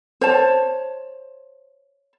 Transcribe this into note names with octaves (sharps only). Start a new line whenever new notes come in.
C5 C#5 A5